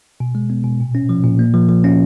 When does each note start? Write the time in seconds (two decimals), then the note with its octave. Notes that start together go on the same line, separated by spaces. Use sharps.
0.20 B2
0.35 G#3
0.50 B3
0.64 B2
0.80 A#2
0.95 C#4
1.09 F3
1.24 A#2
1.39 A#3
1.54 F3
1.69 F3
1.84 C#4